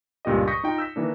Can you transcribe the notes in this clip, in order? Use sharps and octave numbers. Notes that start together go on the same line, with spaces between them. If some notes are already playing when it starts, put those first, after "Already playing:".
C#2 G2 A#2 G4 D#5
C#6 D#6 G6 A#6 B6 C#7
D#4 F4 G5
E6 G6 B6
D#3 E3 A#3 D4